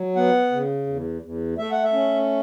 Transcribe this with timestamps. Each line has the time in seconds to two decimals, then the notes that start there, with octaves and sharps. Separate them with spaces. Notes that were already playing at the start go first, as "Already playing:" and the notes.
Already playing: F#3
0.16 B3 F#5
0.52 C#3
0.87 E2
1.22 E2
1.58 A3 E5
1.71 F#5
1.84 E5
1.93 C#4